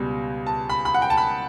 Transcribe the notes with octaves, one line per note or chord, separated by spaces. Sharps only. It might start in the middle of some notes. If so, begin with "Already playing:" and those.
Already playing: C#2 B2 G3
A5
B5
B5
F#5
G5
A5
B5